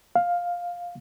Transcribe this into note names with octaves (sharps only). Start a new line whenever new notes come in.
F5